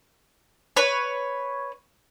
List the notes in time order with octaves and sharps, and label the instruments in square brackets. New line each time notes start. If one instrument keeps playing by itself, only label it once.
[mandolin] B4 C#5